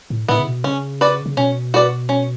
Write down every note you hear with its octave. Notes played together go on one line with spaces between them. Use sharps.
A2
A2 B3 E4
C#3
B2
C#3 C#4
F#4 B4 D5
C#3
B2 C#4
F#4 B4 D5
C#4